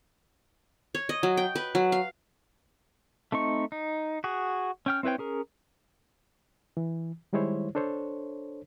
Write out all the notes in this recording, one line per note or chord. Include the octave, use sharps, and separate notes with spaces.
C#5
D#5
F#3
G5
B4
F#3
F5
A3 C4 D#4 C#6
D#4
F#4 G#4
C#4 G5 F6
C4 E4 B4 C#5 G5
C#4 G#4 A#4
E3
D#3 G3 G#3 E4 C5 C#5
D4 A4 C5 C#5